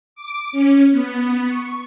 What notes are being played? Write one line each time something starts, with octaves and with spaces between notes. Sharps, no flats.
D6
C#4
B3
C#6